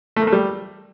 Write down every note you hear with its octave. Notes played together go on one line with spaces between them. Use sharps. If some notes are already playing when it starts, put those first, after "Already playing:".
A3
A#3
A3
G3